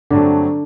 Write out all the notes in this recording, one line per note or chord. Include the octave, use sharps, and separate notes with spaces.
G2 D3 F#3 A3 C4 D4